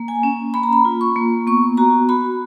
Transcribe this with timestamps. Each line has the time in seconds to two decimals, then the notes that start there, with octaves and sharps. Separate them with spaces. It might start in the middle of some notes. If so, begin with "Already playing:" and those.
Already playing: A#3
0.08 G#5
0.23 C#4
0.54 A#3 B5
0.63 A#5
0.73 B5
0.85 F4
1.01 C#6
1.16 A#3
1.47 B3 C#6
1.77 F#4 A#5
2.09 F#4 B5